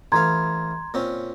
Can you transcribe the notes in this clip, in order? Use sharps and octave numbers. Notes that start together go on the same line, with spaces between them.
A1 E3 F5 A#5 C6 G#6
A#2 C4 C#4